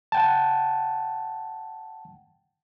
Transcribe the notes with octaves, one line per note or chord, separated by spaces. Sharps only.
F#5 G5 A5